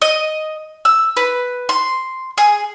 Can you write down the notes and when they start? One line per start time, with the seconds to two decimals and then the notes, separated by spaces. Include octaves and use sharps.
0.02 D#5
0.85 E6
1.17 B4
1.69 C6
2.38 G#4